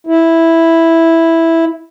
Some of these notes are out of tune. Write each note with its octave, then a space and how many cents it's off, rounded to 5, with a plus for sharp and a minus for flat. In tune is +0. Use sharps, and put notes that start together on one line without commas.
E4 -5